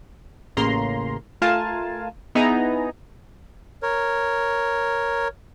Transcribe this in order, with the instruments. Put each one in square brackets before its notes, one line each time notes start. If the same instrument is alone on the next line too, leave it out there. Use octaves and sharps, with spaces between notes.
[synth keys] A1 C#3 A#3 A#5 C6
A3 F4 A#4 F5 G#5 A5
B3 D#4 E4 G#4 G#5 A#5
[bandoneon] A#4 C#5